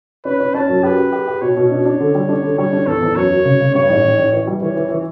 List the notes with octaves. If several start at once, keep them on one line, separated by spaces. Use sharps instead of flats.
C#4 B4
C#4
C#4 A5
F#2
G4 B4
G4
G4
G4
B2 C#5
B2
D4
D4
D3
G3
D4
D3
G3 C#5
D4
E2 A4
E2
F#2 C#5
F#3
C#3
C#3
G2 C#5
A1
A1
A1
E3
G3
E3 C#5
E3
E3